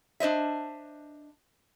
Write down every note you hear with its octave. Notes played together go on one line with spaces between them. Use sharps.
D4 C5 D#5 E5